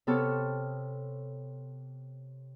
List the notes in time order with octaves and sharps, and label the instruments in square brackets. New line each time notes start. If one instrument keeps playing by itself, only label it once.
[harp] C3 B3 A4 C#5 A5 F6